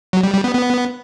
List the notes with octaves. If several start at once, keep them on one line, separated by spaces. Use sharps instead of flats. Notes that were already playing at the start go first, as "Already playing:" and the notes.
F#3
G3
G3
B3
B3